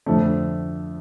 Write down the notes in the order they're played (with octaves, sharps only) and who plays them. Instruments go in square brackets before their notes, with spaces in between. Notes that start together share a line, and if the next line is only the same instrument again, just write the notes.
[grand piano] F2 D3 A3